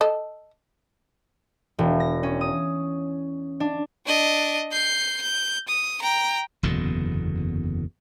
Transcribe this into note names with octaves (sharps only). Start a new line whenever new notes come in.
A4 D#5
E1
A#6
C#4
D#6
D4
D4 D#5
G6 C7
G6
D#6
G5 A#5
F#1 E2 B2 D3